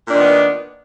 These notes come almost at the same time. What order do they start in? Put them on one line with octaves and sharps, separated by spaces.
A#2 D4 D#3 B3